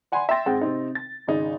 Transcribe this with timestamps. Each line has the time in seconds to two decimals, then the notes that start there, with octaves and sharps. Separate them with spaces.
0.12 D5 F#5 G#5 B5 C6
0.29 E5 G5 C6 A6 A#6
0.46 G#2 C4 G#4 F#5 G5
0.61 C3 C4 D#4
0.95 A6
1.27 G#1 C#3 D#4 G#4